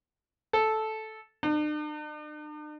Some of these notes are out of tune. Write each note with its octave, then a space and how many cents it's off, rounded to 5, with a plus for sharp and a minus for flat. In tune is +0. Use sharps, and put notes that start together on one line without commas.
A4 -10
D4 +45